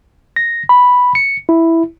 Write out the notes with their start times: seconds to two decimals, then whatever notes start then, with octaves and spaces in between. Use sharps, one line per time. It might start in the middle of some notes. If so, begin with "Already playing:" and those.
0.36 A#6
0.69 B5
1.15 C#7
1.49 E4